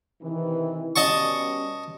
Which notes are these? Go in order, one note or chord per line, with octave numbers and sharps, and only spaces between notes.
C3 D#3 E3
B2 G3 C#4 D#5 A5 C#6